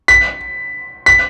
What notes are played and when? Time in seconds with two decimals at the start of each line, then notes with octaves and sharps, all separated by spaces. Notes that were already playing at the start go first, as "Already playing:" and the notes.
0.08 B6
1.06 B6